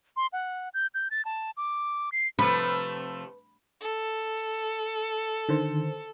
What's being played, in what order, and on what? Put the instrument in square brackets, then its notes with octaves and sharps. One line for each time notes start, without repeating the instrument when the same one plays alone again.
[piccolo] C6
F#5
G6
G6
A6
A5
D6
C7
[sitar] C3 F3 A3 [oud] B4
[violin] A4
[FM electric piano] D3 D#3 C5